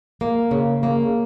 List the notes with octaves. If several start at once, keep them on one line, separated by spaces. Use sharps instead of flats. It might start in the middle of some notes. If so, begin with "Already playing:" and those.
A#3
C#3
A#3